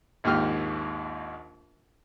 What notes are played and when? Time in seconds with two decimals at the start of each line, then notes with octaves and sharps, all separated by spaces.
0.24 A#1 D#2 G#2 G4 F6